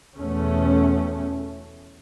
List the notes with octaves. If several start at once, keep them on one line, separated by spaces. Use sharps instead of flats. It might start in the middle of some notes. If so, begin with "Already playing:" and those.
E2 B2 A3 C#4